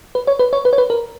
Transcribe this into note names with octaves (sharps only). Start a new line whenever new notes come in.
B4
C#5
B4
C#5
B4
C#5
B4
A#4